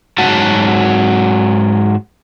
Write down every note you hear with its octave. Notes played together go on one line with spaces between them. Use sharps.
G#2 F#3 F#4 F#5 A5